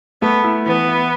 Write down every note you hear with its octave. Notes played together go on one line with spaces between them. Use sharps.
A3 B3
E4
E3 B3
E4